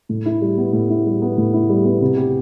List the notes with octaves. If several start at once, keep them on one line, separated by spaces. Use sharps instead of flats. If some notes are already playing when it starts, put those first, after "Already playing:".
A2
E4
G3
B3
A2
E4
G3
B3
A2
E4
G3
B3
C3
G4